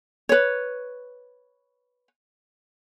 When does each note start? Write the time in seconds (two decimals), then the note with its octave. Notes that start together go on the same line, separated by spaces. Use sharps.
0.29 B4 C#5